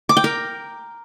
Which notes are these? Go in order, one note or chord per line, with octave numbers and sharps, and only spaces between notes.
D6
G5
A#4